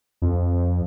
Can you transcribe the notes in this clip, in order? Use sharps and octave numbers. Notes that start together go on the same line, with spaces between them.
F2